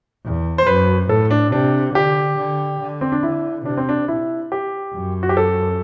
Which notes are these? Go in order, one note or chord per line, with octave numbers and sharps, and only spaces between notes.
E2
C5
F#2 B4
A2 A4
D4
C3 D4
D3 G4
D3
D3
C4
D4
D3 E4
C3 D4
C4
D4
E4
G4
F#2
F#4
G4
A4